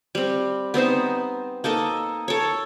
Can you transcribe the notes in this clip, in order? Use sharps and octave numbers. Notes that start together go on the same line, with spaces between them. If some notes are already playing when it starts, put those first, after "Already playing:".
G3 C4
B3 C4 D#4 C5
A#3 D#4 A4 D#5
A4 C#5